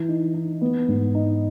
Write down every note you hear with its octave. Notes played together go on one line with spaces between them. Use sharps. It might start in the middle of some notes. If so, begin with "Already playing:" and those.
Already playing: E3
D#4
D#4
B3
G#2
D#4